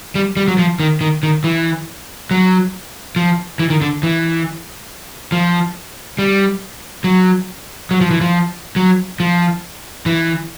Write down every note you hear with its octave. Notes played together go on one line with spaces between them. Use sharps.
G3
G3
F#3
F3
D#3
D#3
D#3
E3
F#3
F3
E3
D#3
D3
E3
F3
G3
F#3
F#3
F3
E3
F3
F#3
F3
E3